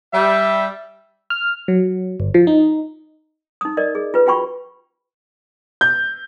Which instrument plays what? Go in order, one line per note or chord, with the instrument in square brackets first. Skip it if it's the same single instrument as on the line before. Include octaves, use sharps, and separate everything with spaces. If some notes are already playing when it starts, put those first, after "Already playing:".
[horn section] G3 [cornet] E5
[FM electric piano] F6
F#3
G1
F3
D#4
[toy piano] D#4 D#6
A#4 D5 D#5
G#4
F4 B4
F4 F#4 G5 B5 C#6
[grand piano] G6